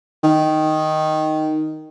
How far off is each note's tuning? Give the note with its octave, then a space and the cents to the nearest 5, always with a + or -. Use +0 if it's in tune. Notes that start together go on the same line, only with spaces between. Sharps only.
D#3 +0